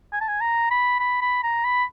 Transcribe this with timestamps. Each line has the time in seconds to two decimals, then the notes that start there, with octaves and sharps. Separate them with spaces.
0.12 G#5
0.21 A5
0.28 G#5
0.41 A#5
0.71 B5
0.99 B5
1.21 B5
1.43 A#5
1.64 B5